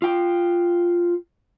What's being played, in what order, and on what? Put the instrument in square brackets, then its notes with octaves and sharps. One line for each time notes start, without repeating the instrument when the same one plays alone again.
[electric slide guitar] F4 G5